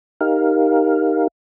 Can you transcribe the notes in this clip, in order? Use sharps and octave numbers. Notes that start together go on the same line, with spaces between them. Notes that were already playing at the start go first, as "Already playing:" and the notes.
D#4 G4 A#4 F5